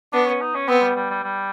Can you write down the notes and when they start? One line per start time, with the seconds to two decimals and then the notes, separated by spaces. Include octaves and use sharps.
0.13 B3 D4
0.26 C#4
0.41 D#4
0.55 C#4
0.68 B3 C4
0.81 G3
0.96 G3
1.10 G3
1.23 G3